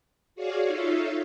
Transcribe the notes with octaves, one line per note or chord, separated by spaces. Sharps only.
F#4 G#4 C#5 D5 F5
D#4 F4 A4 C#5 E5 F5